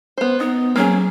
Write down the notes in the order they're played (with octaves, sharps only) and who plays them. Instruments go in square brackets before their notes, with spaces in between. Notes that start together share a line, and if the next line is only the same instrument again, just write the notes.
[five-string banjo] B3 C5
[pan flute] B3 [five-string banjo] D#4
[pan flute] F#3 [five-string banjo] A#3 C#4 G#4